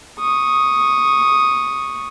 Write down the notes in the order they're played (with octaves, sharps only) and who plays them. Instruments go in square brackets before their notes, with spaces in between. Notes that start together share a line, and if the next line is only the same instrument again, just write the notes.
[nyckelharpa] C#6 D#6